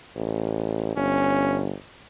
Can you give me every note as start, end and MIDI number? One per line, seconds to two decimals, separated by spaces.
0.16 0.94 33
0.97 1.74 31
0.97 1.64 61